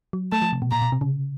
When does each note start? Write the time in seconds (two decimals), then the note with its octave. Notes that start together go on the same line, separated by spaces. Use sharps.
0.13 F#3
0.32 A3 A5
0.42 F3
0.53 C3
0.62 B2
0.71 A#2 A#5
0.82 B2
0.92 C3
1.01 C#3